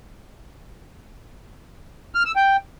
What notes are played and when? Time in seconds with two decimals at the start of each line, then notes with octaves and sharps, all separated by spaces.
2.15 F6
2.25 E6
2.36 G5